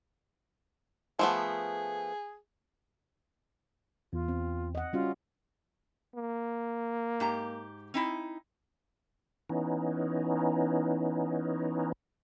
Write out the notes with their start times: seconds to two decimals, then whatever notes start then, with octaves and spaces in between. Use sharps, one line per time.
1.19 F3 A3 B3 G#4
4.13 E2 F4
4.28 C4
4.75 D#5 F#5
4.93 G3 C#4 F4 F#4
6.15 A#3
7.20 G#2 G4 A#5
7.94 C4 D#4 E4
9.49 E3 B3 C#4 D#4